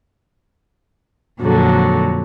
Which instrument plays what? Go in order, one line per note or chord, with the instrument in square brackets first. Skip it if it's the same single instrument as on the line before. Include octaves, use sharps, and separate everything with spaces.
[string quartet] F2 A#2 D3 F#3